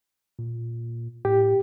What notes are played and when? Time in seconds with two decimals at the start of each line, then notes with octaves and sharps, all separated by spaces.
0.39 A#2
1.25 A2 G4